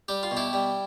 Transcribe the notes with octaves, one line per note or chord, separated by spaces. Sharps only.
G3 G4
F4
B2
E4 G4
G3